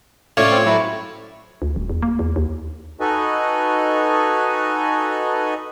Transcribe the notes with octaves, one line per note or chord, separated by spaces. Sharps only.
A2 C#4 F4 C#5 D5
C4
F#3 A3 E4
D2
D#1
E2
A#3
E2
D#2
D#4 F#4 A4 B4 D#5 G#5